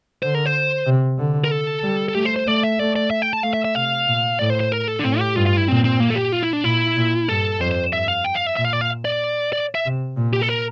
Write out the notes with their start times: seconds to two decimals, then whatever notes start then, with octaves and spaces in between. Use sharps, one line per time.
0.23 D3 C5
0.35 A#4
0.46 C5
0.86 C3
1.18 D3
1.44 A#4
1.51 A4
1.83 G3
2.09 A4
2.15 A3 G4
2.25 C5
2.36 C5
2.47 A3 D5
2.63 E5
2.79 A3 D5
2.96 D5
3.11 E5
3.22 G5
3.33 A5
3.43 A3 F5
3.53 E5
3.65 E5
3.75 C3 F5
4.07 A#2
4.39 A2 D5
4.50 C5
4.60 C5
4.72 A#4
4.88 A4
4.99 D4
5.04 A2 C4
5.19 G4
5.36 G2 F4
5.46 F4
5.57 E4
5.68 A#2 C4
5.84 C4
6.00 A#3
6.10 A4
6.15 G4
6.32 F4
6.43 E4
6.53 D4
6.64 A#2 E4
6.96 A#2
7.28 G2 A4
7.60 F2 C5
7.71 C5
7.92 G2 E5
8.08 F5
8.24 G5
8.35 F5
8.46 E5
8.57 A#2 E5
8.65 F5
8.73 D5
8.81 F5
9.05 D5
9.53 D5
9.75 E5
9.85 C3
10.17 A#2
10.33 G4
10.41 A4
10.49 A#4